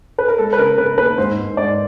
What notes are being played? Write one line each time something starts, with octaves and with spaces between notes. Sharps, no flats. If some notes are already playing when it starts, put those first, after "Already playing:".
B4
A#4
G#3 A4
B4
C#3 A#4
C#3 B4
D#2 B4
G#2 C5
G#2
G#2 D5